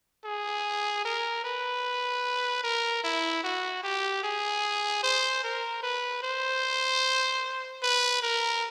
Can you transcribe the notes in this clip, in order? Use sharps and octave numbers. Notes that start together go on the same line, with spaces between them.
G#4
A#4
B4
A#4
E4
F#4
G4
G#4
C5
A#4
B4
C5
B4
A#4